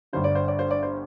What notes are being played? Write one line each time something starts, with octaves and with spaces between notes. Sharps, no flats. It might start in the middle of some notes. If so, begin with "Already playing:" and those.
G1 G2 D3 C5
D5
C5
D5
C5
D5
C5